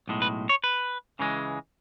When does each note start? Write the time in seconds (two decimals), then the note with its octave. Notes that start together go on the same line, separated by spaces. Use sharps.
0.08 B1 A2 G#3
0.22 B4
0.49 C#5
0.64 B4
1.19 C#2 C#3 E3 G#3